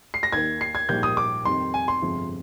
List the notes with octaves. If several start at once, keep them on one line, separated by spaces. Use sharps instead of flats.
C7
A#6
D#2 D#3 A#3 G#6
C7
G#6
A#1 G#2 G3 A#3 G6
D#6
D6
F2 D#3 G3 C6
G#5
C6
G1 F2 C3 F3 G#3